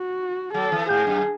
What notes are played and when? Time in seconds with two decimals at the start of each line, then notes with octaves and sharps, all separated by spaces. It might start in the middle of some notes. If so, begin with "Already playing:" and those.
Already playing: F#4
0.54 F#3 A4
0.72 E3
0.90 G#2 G#4
1.07 F#2